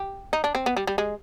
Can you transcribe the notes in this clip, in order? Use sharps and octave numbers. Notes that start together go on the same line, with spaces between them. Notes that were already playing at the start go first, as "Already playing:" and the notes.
Already playing: G4
D#4
D4
C4
B3
G3
G3
G#3